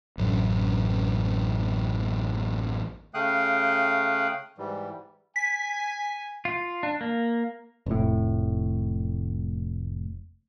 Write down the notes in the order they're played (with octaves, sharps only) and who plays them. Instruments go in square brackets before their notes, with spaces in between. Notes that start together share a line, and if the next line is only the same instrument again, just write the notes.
[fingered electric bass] A1 F#2
[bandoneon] C#3 A3 F5 G5 D#6 F#6
G#2 E3 G3
[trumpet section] G#5 [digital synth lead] B6
[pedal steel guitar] F4
D4
A#3
[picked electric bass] F1 A2